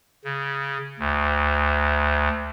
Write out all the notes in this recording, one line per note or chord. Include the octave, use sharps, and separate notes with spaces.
C#3
D2